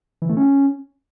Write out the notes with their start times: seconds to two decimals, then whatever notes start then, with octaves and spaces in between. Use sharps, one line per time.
0.22 E3
0.29 A3
0.37 C#4